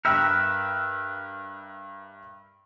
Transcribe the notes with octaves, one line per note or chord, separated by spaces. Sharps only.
G2 A#4 B4 E5 G5 E6